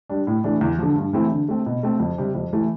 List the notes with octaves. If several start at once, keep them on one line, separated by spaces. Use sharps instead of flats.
G3 D4
A2
E3 A3 D4
E2
D3 F3
G2
E3 A3 C4 E4
D3
A3 C4
B2
A3 C4
F2
C3 G3
F2
E3 A3 E4